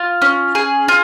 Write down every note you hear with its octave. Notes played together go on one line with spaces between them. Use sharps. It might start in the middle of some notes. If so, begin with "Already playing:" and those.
Already playing: F4
C#4
G#4
F4